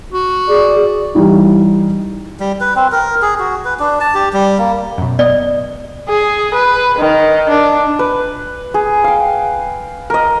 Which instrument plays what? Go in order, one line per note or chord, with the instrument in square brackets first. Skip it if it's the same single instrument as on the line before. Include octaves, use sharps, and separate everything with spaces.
[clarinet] F#4
[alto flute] G#4 [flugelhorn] D5
[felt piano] E3 G3 D#4
[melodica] G3
B4
C4
A#4
G#4
F#4
B4
D4
A5
G4
G3
A#3
[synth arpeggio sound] F#2 B2
[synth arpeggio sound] B3 D#5 [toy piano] D5
[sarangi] G#4
B4
D#3
D4
[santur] B4
G#4
F5 G5
A#4 D#5